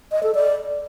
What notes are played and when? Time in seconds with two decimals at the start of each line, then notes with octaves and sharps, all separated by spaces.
0.12 D#5
0.23 A4
0.35 D5